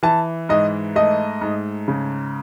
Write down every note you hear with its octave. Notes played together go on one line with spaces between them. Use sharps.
E3 A5
G#2 D#5
A3 D#5
G#2
C#3